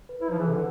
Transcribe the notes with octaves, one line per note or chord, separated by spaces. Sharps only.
B4
E4 B4
F3
E3 G#4
C3 A4
D3